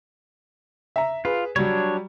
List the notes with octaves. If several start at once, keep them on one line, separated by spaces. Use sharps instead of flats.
E5 A#5
F4 G#4 B4
F#3 G3 D4 C#5